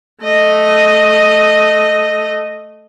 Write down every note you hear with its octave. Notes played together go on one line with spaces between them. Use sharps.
A3 D#5